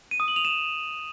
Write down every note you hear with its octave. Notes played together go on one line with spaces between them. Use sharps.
D#7
D#6
F#7
F7
E7